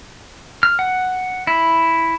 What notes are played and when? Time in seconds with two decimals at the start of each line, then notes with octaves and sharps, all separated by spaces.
0.63 F6
0.79 F#5
1.47 E4